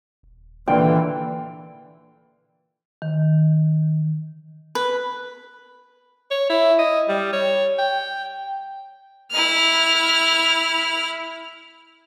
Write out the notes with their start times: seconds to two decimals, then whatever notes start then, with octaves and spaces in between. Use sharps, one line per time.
0.23 D#1
0.68 A#2 D3 E3 G5
3.02 D#3
4.75 B4
6.31 C#5
6.49 E4
6.79 D#5
7.08 G3
7.33 C#5
7.79 G5
9.31 E4 F6